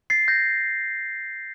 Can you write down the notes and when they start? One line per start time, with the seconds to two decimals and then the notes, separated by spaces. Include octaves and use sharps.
0.10 A6 C7
0.28 G6 A#6